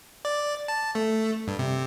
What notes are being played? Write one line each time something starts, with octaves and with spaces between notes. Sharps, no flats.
D5
A5
A3
G2
C3